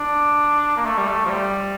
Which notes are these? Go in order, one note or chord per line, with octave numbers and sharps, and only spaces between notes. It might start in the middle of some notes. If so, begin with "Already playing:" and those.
Already playing: D4
A#3
A3
G3
A3
F3
G3